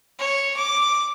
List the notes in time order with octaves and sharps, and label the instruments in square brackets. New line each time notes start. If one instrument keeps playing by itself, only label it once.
[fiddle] C#5
D6